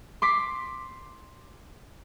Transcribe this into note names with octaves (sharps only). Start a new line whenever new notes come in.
C6 D6 B6